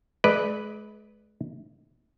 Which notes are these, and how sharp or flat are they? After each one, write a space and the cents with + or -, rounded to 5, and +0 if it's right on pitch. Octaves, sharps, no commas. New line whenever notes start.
G#3 +35 B4 +0 D5 +10